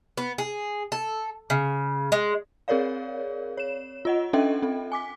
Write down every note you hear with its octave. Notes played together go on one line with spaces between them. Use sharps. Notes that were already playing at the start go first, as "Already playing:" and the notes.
B3
G#4
A4
C#3
G#3
C4 G#4 A#4 C#5 D5 F5
C#5 E7
F4 D#5 F#5
C#4 D4 A4 D#5 E5 G5
C4 A4
G#5 D6 B6